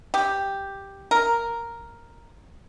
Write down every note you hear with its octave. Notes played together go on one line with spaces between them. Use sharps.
G4
A#4